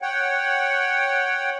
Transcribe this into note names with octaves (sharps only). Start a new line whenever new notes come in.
C#5 F#5 G5